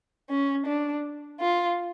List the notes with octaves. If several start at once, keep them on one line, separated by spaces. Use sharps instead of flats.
C#4
D4
F4